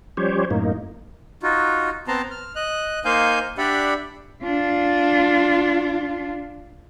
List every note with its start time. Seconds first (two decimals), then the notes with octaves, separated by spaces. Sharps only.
0.17 F3 G3 C#4 G4 C5 C#5
0.51 F#2 A2 A#3 D#4
1.43 D#4 F4 F#4
2.08 B3 C4 A5 A#5 C6
2.31 F6
2.56 D#5 F#6
3.05 A#3 D#4 C5 F5 G#5 G6
3.58 D4 G4 D5 E5 F#5 B5
4.44 D4 F4